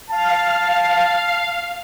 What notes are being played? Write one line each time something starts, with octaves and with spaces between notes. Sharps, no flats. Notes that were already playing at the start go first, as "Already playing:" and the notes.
F5 A5